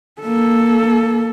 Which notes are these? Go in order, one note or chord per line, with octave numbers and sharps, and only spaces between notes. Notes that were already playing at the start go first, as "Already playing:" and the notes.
A#3 A4